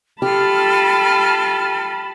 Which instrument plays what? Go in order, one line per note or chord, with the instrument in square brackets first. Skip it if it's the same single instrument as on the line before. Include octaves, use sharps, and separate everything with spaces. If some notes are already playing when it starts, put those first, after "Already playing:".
[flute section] F4 A4 F6 [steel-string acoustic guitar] G4 [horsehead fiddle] A5 B5